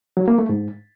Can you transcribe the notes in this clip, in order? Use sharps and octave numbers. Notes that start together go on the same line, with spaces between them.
F#3
A#3
A3
G#2